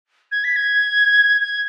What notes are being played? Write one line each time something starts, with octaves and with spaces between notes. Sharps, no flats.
G#6
B6
G#6
G#6